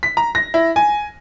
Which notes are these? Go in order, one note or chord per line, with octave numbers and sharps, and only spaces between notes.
B6
A#5
A#6
E4
G#5